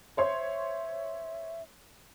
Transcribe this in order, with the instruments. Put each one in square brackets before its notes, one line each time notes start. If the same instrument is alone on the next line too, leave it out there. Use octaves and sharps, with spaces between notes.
[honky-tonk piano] C5 C#5 C6 [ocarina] E5